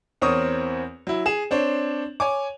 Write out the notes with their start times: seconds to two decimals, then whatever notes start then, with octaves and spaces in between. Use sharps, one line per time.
0.22 E2 C4 A#4 C#5 C#6 D#6
1.07 F#3 E4
1.26 G#4 E7
1.51 C4 D4 C5 C#5
2.20 C#5 G#5 D6